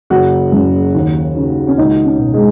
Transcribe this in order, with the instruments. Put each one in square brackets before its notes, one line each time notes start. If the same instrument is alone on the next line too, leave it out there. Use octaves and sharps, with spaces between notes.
[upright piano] F#1 F#4
F#2 C#3
D#2
C#3
C#4
C#2 D#4
C#4
B2
G#3